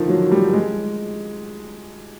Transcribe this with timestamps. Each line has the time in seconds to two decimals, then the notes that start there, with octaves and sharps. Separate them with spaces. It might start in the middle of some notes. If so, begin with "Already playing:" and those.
Already playing: D3 D#3 F3
0.08 F#3
0.32 G3
0.53 G#3